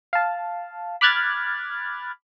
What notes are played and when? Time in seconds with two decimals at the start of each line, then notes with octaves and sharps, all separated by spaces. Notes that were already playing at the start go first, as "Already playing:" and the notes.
0.13 F5 A5
1.01 B5 D6 F6 F#6 G#6 A6